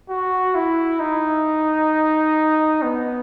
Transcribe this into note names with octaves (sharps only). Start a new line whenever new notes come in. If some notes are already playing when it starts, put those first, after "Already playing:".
F#4
E4
D#4
B3